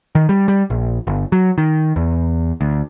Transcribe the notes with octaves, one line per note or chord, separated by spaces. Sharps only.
D#3
G3
G3
A#1
G1
F#3
D#3
E2
D2